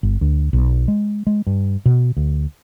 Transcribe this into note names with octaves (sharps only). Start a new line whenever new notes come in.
G1
D2
B1
G#3
G#3
G2
B2
D2